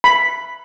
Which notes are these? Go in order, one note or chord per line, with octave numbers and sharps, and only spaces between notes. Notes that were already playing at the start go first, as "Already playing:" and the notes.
B5